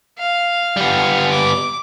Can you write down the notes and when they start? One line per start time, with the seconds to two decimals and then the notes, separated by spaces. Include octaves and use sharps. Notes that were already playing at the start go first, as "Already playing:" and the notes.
0.19 F5
0.77 G3 B3
1.31 D6